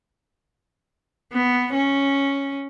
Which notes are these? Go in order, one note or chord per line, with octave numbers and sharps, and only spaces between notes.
B3
C#4